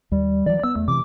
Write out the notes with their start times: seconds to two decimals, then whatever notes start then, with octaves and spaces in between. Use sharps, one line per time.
0.11 D#2 G3
0.46 E3 F#3 D5
0.64 B3 E6
0.76 E2 A3
0.88 C3 E3 D6